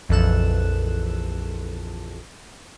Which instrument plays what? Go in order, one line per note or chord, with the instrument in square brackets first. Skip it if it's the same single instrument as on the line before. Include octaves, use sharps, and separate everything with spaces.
[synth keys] A#1 F2 E3 A4 F#6 E7